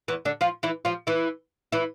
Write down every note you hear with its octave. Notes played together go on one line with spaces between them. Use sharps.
E2 E3
D3 D4
F3 F4
E3 E4
F3 F4
E3 E4
E3 E4